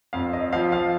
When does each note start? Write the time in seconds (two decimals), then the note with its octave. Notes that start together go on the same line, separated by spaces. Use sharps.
0.13 F2 F5
0.33 D#5
0.53 F3 F5
0.72 F5